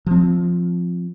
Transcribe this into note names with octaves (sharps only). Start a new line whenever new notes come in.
F3 C4